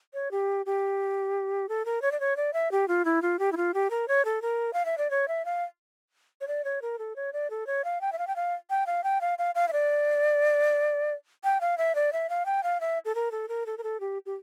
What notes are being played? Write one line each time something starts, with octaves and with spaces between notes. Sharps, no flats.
C#5
G4
G4
A4
A#4
C#5
D5
C#5
D5
E5
G4
F4
E4
F4
G4
E4
F4
G4
A#4
C#5
A4
A#4
F5
E5
D5
C#5
E5
F5
C#5
D5
C#5
A#4
A4
C#5
D5
A4
C#5
F5
G5
E5
F5
G5
F5
G5
F5
G5
F5
F5
F5
E5
D5
G5
F5
E5
D5
E5
F5
G5
F5
E5
A4
A#4
A4
A#4
A4
A#4
A4
G4
G4